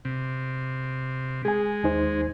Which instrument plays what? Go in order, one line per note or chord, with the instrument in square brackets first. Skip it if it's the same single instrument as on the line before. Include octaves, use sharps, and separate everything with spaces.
[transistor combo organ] C3
[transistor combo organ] G#3 [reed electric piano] G#4 G#5
[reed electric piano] D#2 D#4 C5